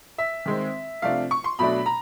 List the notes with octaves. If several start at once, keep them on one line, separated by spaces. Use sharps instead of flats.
E5
D#3 G#3 C4
C3 F3 A3 D4 F5
C#6
C6
B2 F#3 A3 D4 B5
A#5